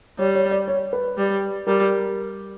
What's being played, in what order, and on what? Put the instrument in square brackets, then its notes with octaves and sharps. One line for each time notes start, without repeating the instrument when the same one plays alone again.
[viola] G3 [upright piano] C#5
[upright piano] C#5
D5
C#5
B4
[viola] G3
[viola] G3 [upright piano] A#4